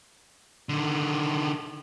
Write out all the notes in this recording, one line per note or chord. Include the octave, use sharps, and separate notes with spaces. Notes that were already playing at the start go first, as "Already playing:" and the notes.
D3 D#3